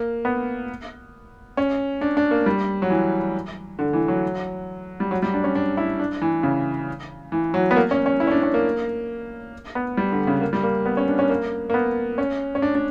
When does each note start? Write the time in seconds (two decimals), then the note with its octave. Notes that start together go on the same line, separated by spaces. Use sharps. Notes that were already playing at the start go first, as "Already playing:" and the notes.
Already playing: A#3
0.25 B3
1.57 C#4
2.01 D4
2.17 D4
2.31 A#3
2.46 G3
2.82 F#3
2.90 E3
3.79 D3
3.93 E3
4.08 F#3
5.00 G3
5.11 F#3
5.22 G3
5.34 D4
5.44 C#4
5.55 D4
5.77 E4
5.99 D4
6.22 E3
6.43 C#3
7.32 E3
7.54 F#3
7.71 B3
7.76 A#3
7.91 C#4
8.06 C#4
8.20 E4
8.27 C#4
8.31 D4
8.43 C#4
8.54 A#3
9.75 B3
9.97 G3
10.12 D3
10.27 C#3
10.41 A#3
10.53 G3
10.63 A#3
10.85 B3
10.97 C#4
11.08 D4
11.19 C#4
11.29 A#3
11.70 A#3
11.74 B3
12.18 C#4
12.55 C#4
12.62 D4
12.75 D4